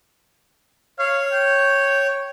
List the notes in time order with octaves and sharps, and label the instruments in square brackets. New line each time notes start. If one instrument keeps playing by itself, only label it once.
[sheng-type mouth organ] C#5 [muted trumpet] F5
[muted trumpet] G5